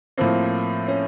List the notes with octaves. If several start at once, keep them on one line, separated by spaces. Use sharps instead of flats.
A2 F3 A#3 C4
C#4